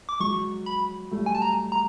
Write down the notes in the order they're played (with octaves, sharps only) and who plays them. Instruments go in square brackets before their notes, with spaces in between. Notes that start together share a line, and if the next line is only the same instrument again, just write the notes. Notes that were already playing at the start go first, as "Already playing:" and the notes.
[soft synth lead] D6
[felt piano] F#3 G#3 [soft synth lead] C#6
[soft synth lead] B5
[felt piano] G3 A3
[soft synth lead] G#5
A5
A#5
A#5